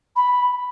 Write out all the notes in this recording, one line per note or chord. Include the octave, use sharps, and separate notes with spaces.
B5